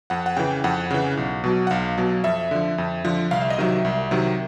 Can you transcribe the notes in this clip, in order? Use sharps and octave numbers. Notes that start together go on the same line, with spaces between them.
F2 F#5
F#5
C#3 E3 G5
F2 F#5
C#3 E3
B1
B2 F#3
F#5
B1 F5
B2 F#3
F2 E5
D3 F3
F2
D3 F3
C2 F5
E5
D#5
C3 D#3 F#3 E5
C2
C3 D#3 F#3